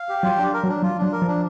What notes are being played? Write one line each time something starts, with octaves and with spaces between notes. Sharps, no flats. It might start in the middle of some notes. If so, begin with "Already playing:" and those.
Already playing: F5
G4
F#3 F4
D4
A#4
F#3
D4
F#3 F4
F#3 D4
A#4
F3
D4